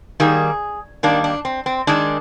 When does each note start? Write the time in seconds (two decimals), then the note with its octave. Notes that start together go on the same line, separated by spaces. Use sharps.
0.20 D#3 G3 A#3 G#4
1.03 D#3 G3 A#3 D4
1.24 D4
1.45 C4
1.66 C4
1.87 D#3 G#3 D4